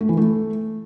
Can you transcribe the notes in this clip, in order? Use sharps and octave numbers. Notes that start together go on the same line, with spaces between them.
A3
E3
A3